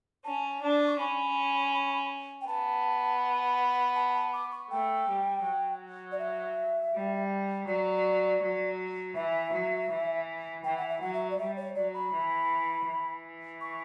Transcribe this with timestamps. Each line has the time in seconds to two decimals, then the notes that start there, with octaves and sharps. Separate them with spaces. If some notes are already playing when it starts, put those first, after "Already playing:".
0.25 C#4 A5
0.62 D4
0.87 C#6
0.99 C#4 B5
2.41 G5
2.47 B3 A5
3.96 A5
4.14 A5
4.33 D6
4.52 C#6
4.70 A3 G5
5.08 G3
5.44 F#3
6.12 D5
6.19 E5
6.93 G3
7.67 F#3 D5
8.41 F#3
9.15 E3 E5
9.52 F#3
9.90 E3
10.64 E3 G5
10.78 F#5
10.89 E5
11.01 F#3 F#5
11.13 E5
11.30 D5
11.38 G3 E5
11.57 C#5
11.75 F#3 D5
11.94 B5
12.12 E3
12.86 E3
13.61 C#6